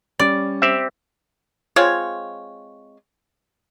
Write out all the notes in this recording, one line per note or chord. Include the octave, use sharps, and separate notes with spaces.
G3 C#4 D5
C4 G4 E5
G#3 C4 F4 C#5